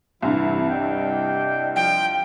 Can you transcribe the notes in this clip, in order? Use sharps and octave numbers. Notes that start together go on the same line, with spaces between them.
C2 G2 E3 E4
D5 D#5 G5
F3 G5